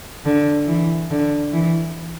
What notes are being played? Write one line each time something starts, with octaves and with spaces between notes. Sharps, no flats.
D3
E3
D3
E3